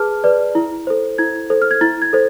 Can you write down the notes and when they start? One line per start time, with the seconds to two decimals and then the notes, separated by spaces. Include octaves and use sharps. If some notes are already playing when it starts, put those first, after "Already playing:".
Already playing: G#4 B4 A5 F6
0.24 B4 D5
0.55 E4
0.87 A4 C5
1.18 E4 G#6
1.50 A4 C5
1.62 F6
1.71 G#6
1.81 E4 A6
2.02 G#6
2.13 A4 C5